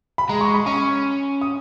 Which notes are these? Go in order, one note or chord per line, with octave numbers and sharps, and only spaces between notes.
B5
G#3 A#5
C#6
B5
C#4 C#6
D#6